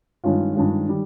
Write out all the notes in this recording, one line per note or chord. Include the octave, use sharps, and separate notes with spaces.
G2 D#3 G#3 C#4 F4
G2 D#3 G#3 C#4 F4
D#3 G3